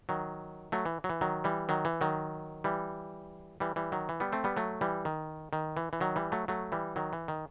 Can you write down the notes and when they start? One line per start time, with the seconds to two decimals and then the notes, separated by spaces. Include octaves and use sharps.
0.09 D#3 F#3
0.72 F#3 A3
0.86 E3
1.04 F#3
1.10 E3
1.21 D#3 F#3
1.44 E3 G3
1.69 D#3 F#3
1.85 E3
2.01 D#3 F#3
2.64 E3 G3
3.60 E3 G3
3.76 E3 G3
3.92 D#3 F#3
4.09 E3
4.20 G3 B3
4.33 A3 C4
4.44 G3 B3
4.57 F#3 A3
4.81 E3 G3
5.05 D#3
5.53 D#3
5.77 E3
5.93 E3
6.01 D#3 F#3
6.16 E3 G3
6.32 F#3 A3
6.48 F#3 A3
6.72 E3 G3
6.96 D#3 F#3
7.13 E3
7.28 D#3